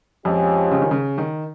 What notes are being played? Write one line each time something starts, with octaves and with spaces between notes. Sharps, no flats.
F2 F3 G#3 C#4 G4
C#3
D#3
C#3
D#3